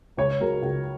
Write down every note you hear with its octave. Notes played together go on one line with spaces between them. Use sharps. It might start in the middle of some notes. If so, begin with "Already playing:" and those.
C#2 C#5
C#3 F#3 A#4
C#2